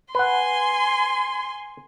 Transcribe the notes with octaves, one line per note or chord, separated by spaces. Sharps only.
B4 F#5 G#5 C6